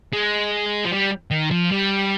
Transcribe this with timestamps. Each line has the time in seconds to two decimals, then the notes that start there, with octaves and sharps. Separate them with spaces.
0.13 G#3
0.84 F3
0.92 G3
1.31 D#3
1.51 F3
1.71 G3